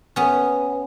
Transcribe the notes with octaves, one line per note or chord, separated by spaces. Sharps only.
B3 C#4